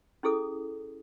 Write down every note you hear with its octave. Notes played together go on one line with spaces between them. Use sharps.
C#4 E4 G#4 A4 D#6